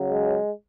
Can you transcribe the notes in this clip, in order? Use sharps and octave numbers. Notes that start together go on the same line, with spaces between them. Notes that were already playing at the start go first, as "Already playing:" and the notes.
Already playing: C#3 F#3
G#3